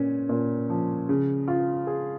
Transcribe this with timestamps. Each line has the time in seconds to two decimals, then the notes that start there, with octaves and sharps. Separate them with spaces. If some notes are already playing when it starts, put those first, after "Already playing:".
Already playing: A#2 C#4
0.29 A#2
0.70 F3
1.09 C#3
1.48 F4
1.87 G#4